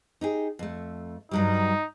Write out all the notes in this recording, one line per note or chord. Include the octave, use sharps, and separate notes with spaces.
D#4 G4 G#4
F2 A3
G2 F#3 G3 D#4